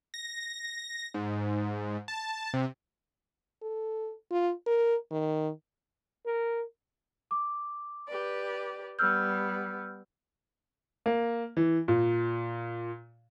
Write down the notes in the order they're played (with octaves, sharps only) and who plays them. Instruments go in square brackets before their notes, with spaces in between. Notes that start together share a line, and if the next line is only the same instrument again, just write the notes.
[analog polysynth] A#6
G#2
A5
C3
[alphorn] A4
F4
A#4
D#3
[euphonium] A#4
[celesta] D6
[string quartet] G4 B4 D5
[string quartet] G3 B3 [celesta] E6 F6 G6
[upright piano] A#3
E3
A#2